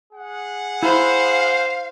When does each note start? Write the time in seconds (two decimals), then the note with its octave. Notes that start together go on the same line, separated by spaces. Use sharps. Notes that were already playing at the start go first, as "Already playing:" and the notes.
0.14 G#4 F#5
0.83 E4 C5 F5